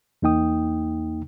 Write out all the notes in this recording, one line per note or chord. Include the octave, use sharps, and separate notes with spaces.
E2 A#3 D#4 G5 D#6